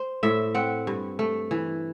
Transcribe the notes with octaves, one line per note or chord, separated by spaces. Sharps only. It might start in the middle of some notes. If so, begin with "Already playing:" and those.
Already playing: C5
A2 E5
C4 F#5
G2
A3
E3